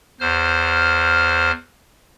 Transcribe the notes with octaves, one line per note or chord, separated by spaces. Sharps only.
E2 C5 F6